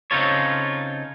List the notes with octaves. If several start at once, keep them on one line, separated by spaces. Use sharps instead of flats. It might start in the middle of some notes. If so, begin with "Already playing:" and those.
C#3 C4 D#4 F4 A4 C#5